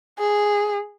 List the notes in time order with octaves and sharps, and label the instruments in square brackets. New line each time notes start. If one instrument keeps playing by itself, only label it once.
[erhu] G#4